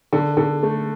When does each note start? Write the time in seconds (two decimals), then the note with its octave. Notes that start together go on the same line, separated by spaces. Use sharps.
0.13 D3
0.37 D3
0.63 A3